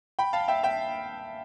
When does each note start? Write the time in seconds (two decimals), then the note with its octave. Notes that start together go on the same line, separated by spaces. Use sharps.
0.19 G5 B5
0.33 F5 A5
0.48 E5 G5
0.63 E5 G5